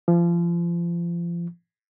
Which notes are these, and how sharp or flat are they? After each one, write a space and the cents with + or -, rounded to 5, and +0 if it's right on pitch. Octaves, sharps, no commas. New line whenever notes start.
F3 -30